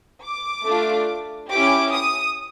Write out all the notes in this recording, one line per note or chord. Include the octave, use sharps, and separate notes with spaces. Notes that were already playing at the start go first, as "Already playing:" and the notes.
D6
A3 D4 F4
C#4 E4 G4 D6
D#6